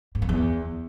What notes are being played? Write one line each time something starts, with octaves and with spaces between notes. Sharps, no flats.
G#2
F#2
E2